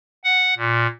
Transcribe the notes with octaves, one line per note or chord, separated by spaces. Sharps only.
F#5
A#2